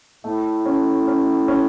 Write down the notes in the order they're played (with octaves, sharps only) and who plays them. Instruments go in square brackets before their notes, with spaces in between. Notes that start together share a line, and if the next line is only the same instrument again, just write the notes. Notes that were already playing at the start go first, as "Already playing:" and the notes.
[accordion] A2 [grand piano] A3
[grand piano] C#4
C#4
C#4